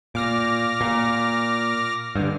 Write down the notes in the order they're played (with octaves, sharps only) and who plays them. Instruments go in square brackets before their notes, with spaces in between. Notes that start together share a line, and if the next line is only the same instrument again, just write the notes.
[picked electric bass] A#2 [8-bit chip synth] D6 F6 A#6
[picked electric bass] A#2
G2 D3